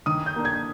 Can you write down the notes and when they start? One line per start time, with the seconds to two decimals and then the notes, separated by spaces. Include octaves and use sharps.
0.06 D#3 D#6
0.26 G6
0.36 A#3 D4
0.45 G#6